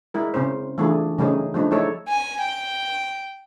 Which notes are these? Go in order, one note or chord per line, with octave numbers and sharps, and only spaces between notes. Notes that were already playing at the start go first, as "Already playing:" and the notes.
G#3 E4 A#4
C#3 C4 C#4 C5
E3 G3 A3 D4 F4 G#4
C#3 G3 A3 C#4 D#4 G#4
F3 G3 A3 D4 D#4
G#3 A3 D#4 E4 A4 C#5
G#5
G5